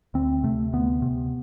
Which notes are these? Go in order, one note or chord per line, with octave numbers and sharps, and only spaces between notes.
D2 C4
C3 A3
D2 B3
C3